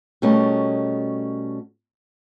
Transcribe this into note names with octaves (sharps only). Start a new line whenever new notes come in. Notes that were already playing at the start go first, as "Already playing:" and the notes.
B2 G3 A3 C#4 A#4 D#5